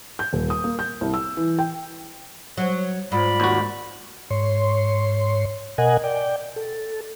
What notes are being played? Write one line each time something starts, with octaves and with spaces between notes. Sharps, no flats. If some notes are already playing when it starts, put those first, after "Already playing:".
G6
D#1
D#6
A#3
G6
C2
E6
E3
G5
F#3
G#2 F4 D5 B5
D#2 F#4
G#2 C#5 C6
B2 A#4 D#5 F#5 G#5
D5 G5
A4